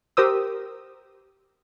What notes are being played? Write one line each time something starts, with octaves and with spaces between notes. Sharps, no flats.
G4 A#4 C5 D#6 E6